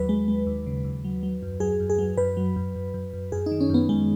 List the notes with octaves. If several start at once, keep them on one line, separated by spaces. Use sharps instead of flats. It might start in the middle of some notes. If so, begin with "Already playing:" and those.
Already playing: D#2 F#3 B4
G#3
G#3
D#2
C#3
D#2
F#3
F#3
F#2
F#3 G#4
F#2
G#4
F#3
F#2 B4
F#3
F#2
F#2
F#2
F#2
F#2 G#4
D#4
D#3
C#4
F#2 B3
F#2 G#3